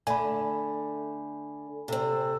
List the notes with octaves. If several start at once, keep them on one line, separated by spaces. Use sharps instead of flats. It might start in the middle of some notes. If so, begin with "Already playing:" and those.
D3 A3 G#5 B5
C3 C4 A4